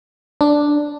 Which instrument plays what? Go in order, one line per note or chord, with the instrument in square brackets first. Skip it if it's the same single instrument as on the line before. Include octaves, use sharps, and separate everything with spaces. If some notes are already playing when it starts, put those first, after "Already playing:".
[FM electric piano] D4